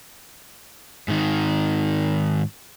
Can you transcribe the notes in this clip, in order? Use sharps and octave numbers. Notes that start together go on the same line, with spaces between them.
G#2 D#3